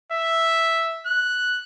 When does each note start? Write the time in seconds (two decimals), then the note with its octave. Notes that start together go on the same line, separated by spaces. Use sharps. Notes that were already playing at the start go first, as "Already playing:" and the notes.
0.12 E5
1.06 F#6